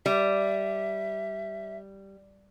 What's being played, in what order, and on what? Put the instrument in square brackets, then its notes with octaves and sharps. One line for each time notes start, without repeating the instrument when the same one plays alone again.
[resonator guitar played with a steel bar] G3 [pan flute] E5